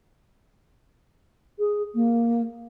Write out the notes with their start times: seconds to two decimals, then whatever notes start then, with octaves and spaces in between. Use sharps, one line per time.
1.59 G#4
1.94 A#3